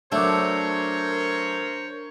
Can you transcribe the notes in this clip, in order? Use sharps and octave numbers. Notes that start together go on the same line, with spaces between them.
F#3 A3 D4 A#4 C5 C#5